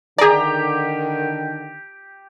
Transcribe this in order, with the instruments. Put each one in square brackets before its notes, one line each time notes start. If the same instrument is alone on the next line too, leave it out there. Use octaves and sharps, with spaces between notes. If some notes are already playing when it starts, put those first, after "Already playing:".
[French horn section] D3 D#3 [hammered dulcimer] G4 A#5 [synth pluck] G#4 D5